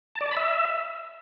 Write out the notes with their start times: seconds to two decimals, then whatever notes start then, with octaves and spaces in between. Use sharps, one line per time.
0.15 A5
0.21 D5
0.26 A5
0.31 B5
0.37 E5